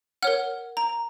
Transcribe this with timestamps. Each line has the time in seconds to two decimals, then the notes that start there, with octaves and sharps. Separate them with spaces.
0.22 A#4 C#5 F#5 F6
0.77 A#5